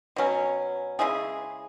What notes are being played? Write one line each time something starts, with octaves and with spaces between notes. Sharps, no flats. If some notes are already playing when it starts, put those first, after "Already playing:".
B2 F#3 C#4
C#3 G#3 E4 G#4